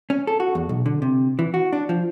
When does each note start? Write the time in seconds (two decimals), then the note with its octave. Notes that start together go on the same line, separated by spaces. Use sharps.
0.10 C#4
0.27 A4
0.40 F#4
0.55 E2
0.69 B1
0.86 D3
1.02 C3
1.39 E3
1.54 F#4
1.73 D4
1.89 F3